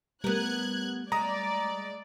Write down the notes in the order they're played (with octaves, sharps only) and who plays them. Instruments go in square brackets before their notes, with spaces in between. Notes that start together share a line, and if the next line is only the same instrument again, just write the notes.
[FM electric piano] G3 A3 [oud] B3 A#4 [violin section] F#6 G#6
[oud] G#3 [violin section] D5 [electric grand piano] A#5 D#6